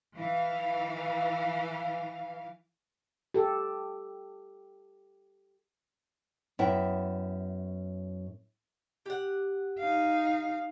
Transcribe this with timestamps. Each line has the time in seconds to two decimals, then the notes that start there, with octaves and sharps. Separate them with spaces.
0.17 E3 F5
3.34 G4 A4
6.59 F#2 B3 E4 E5 G5
9.06 G4 F#5
9.79 D#4 F5